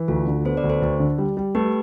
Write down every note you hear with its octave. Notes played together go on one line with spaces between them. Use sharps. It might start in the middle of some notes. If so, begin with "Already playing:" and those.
Already playing: E3
D2 F4 A4
D3
B3 A4 C5
B4 D5
D2
A4 C5
D2
D3
G3
G3
A3 G4 B4